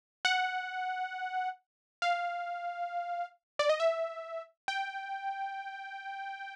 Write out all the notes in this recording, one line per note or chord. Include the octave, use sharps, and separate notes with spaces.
F#5
F5
D5
D#5
E5
G5